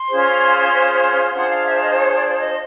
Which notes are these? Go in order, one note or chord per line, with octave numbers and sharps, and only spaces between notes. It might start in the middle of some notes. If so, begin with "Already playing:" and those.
Already playing: C6
C#4 F4 G#4 C5
D4 F4 G#4 C5 F#5
F5
E5
D#5
C#5
D5
D#5